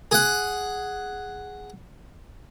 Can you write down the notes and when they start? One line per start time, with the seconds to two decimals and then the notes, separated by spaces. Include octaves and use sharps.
0.11 G#4 F#5